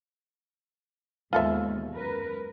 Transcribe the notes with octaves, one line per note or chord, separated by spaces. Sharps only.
D#2 G#2 B2 F4 A4 E5
F#2 A#4 B4